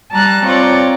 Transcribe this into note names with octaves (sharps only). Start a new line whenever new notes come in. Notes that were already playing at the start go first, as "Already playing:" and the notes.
G3 A5 A#5 F#6
C4 F4 C#5 D5 A#5